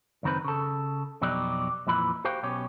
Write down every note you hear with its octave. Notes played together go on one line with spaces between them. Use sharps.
C#2 F#2 D#3 C4 B4
C#3 A4
F2 B2 F#3 D#4 G4 D5
F2 A#2 E3 B5
F#4 G4 C5 F5 G5
B1 B2 C#4 G4 C#5